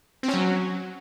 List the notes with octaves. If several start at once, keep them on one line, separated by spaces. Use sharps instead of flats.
C4
C#4
F#3